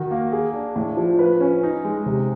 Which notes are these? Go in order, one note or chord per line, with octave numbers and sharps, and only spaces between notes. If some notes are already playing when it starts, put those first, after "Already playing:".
Already playing: D#3 F#4
A#3
G#4
D4
A2
F3
B4
C#4
D#4
G#3
C3